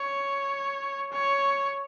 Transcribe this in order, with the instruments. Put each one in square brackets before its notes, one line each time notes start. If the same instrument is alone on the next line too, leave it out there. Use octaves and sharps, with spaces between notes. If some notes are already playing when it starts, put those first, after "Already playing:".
Already playing: [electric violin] C#5
C#5